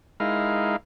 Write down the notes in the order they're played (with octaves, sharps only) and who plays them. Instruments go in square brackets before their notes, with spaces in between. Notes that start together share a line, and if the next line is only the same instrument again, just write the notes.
[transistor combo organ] G#3 D#4 E4 A#4 F5